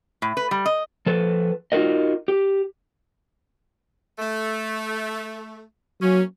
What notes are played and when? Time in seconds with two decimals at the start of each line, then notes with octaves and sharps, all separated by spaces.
0.22 A2
0.37 B4
0.51 G3
0.66 D#5
1.06 F3 A4 B4
1.72 D#4 F4 F#4 A#4 D#5
2.28 G4
4.19 A3
6.01 F#3 A#3 C#4